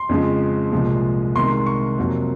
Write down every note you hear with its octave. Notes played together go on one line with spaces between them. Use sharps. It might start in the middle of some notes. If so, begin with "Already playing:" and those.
Already playing: C6
F2 C#3 F3 G#3
C2 A#2 F3 G#3
C2 C3 D#3 G#3 C6
C#6
F2 C3 F#3 A#3